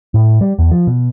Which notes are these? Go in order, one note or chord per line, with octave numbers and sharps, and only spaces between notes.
A2
G3
E2
F3
B2